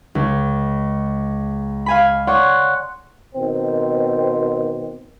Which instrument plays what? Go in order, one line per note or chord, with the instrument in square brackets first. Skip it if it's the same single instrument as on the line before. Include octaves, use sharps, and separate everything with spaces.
[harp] C#2
F5 G#5 B5
C#5 D5 F#5 C6
[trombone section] B2 D#3 C4